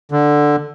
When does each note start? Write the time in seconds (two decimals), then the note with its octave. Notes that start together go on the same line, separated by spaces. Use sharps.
0.12 D3